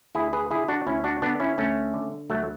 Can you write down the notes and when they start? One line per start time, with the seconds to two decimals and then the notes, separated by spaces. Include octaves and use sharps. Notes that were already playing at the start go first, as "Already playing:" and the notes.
0.15 D2 E4 G#4
0.33 G#4 B4
0.51 D3 E4 G#4
0.68 D4 F#4
0.87 D2 C#4 E4
1.04 D4 F#4
1.22 D3 B3 D4
1.40 C#4 E4
1.58 D2 A3 C#4
1.94 D3
2.29 D2 F#3 A3